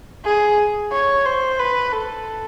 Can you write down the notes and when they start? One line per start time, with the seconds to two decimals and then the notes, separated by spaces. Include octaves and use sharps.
0.25 G#4
0.92 C#5
1.25 C5
1.59 B4
1.92 A4